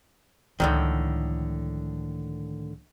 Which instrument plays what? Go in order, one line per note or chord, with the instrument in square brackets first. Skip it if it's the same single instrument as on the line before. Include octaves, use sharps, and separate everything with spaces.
[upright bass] C#2 F3 [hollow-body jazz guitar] A2 D3 D#3